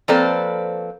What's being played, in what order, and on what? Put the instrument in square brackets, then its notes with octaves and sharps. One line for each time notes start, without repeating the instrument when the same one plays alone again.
[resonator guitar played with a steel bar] F3 A#3 C4 A4 B4 D5